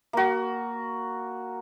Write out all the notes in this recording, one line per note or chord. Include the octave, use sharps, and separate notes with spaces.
A#3 F#4